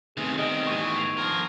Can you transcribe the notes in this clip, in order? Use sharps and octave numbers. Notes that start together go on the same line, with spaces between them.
D2 C3 D#3 B3 G#4
C3 G3 D#5 D7
A2 E3 C#6 D#7
G#6 C7 F7
G2 F3 A#4